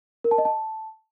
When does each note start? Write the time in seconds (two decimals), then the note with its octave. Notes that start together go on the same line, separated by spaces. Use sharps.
0.24 A#4
0.31 A5
0.38 D#5
0.45 A5